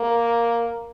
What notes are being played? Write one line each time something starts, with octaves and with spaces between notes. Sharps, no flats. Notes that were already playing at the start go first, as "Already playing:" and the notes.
Already playing: A#3